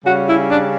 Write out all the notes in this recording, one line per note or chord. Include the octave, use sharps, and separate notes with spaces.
C#3 G3 C#4 F#4
E4
D4